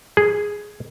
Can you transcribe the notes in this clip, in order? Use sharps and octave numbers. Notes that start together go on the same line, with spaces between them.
G#4